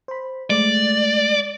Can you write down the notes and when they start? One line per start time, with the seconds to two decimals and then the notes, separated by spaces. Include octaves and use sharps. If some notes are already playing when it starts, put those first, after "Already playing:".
0.08 C5 B5
0.50 G#3 A3 D5 D6